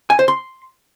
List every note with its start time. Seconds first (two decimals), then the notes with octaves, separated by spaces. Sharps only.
0.10 G#5
0.19 C5
0.28 C6